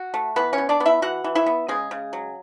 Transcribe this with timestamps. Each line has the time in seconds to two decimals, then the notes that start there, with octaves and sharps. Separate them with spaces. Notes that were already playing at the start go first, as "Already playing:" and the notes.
Already playing: F#4
0.14 A3
0.36 E3 B3 B4
0.53 C#4 C#5
0.58 B3
0.69 D4 D5
0.80 B3
0.86 E4 E5
1.02 E3 F#4 F#5
1.24 E3
1.35 E4 E5
1.46 B3
1.68 C#3 G#3 G#4
1.91 C#3
2.13 F#3